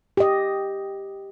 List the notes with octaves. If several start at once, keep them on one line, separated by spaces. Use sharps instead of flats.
G4 D#5